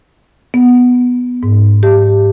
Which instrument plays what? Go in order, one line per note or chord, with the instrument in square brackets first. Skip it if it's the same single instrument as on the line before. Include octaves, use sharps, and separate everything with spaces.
[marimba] B3
G#2
G4